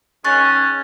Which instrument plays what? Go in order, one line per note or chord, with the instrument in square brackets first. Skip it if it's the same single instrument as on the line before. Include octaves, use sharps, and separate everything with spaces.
[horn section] D#3 G#3 C#4 [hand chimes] C#6 F#6 A6